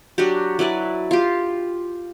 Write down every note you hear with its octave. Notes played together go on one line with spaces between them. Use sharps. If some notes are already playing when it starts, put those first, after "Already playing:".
F#3 D4 F#4 G4
F#3 E4 B4 D5
F4 G4